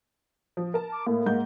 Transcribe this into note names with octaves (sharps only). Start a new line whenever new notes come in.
F3
A#4 A5
D6
A2 A#3
G#2 F#5 G6